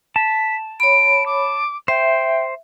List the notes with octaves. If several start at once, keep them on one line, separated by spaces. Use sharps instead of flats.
A5 B6
C#5 B5 D7
D6
C5 E5 G5